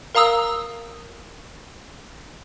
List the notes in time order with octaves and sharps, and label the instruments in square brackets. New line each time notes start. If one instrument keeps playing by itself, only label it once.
[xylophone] A#4 F5 A#5 D#6 E6